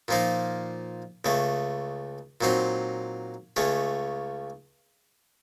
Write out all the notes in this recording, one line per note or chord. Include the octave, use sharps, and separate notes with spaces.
A#2 F3 A#3 D#4
C#2 C#3 A3
A#2 F#3 C4 D#4
C#2 C#3 A3 C#4